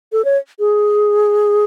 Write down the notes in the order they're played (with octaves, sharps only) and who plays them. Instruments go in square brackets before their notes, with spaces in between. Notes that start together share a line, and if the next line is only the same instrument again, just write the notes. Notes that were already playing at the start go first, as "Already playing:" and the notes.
[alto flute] A4
C#5
G#4